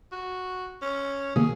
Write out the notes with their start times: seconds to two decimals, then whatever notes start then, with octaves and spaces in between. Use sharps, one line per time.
0.12 F#4
0.82 C#4
1.36 B2 D#3 A#3 G#4